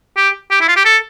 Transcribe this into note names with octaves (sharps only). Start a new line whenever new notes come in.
G4
G4
E4
F4
G4
A4